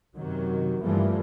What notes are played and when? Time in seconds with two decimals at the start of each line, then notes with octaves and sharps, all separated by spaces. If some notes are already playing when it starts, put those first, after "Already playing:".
0.16 F#2 C3 D#3 F#3
0.81 G2 E3 F3 G3 A3 A#3